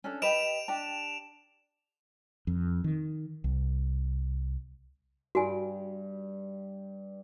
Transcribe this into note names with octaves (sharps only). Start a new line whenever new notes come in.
C#4 D4 A4
G4 B4 D#5 D7 E7 F7
D4 G4 A5
F2
D#3
C2
G2 F#4 G#5